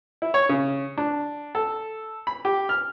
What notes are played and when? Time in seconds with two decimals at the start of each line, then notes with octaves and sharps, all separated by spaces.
0.22 E4
0.34 C#5
0.49 C#3
0.98 D4
1.55 A4
2.27 B5
2.45 G4
2.69 F6